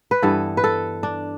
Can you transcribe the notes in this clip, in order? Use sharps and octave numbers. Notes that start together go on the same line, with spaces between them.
B4
G2 E3 B3 A4
B4
A4
D4